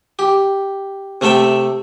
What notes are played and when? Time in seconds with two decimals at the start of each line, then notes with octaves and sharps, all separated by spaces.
0.19 G4
1.21 C3 A3 A4 E5 G5